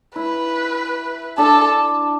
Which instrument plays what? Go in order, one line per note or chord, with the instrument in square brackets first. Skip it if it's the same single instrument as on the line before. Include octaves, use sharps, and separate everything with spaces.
[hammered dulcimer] E4 [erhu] B4
[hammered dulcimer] D4 [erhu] A4